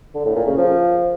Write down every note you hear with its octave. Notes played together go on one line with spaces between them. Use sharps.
D3
A2
A#2
C#3
F3